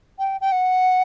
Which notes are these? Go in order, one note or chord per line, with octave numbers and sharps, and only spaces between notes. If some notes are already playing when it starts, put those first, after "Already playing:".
G5
G5
F#5